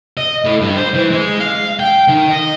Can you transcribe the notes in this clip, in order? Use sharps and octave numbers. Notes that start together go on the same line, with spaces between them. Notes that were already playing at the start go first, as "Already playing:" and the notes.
D#5
A2
G2
C5
E3
G#3
F5
G5
D#3
D#5